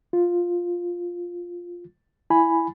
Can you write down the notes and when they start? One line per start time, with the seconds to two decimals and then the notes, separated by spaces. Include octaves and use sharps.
0.13 F4
2.30 E4 G#5 B5